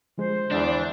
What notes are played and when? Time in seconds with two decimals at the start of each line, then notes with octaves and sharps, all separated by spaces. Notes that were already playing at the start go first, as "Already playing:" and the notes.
0.18 D3 F3 G#3 C5
0.51 E2 D4